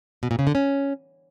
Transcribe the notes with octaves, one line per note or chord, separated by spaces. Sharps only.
B2
A#2
C#3
D3
C#4